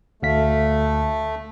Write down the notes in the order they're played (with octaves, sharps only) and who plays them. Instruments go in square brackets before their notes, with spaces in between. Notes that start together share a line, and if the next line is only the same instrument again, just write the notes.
[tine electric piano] D2 F5 B6 [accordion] A3